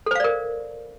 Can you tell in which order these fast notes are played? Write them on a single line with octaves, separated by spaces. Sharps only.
A4 C5 F5 D5 A#4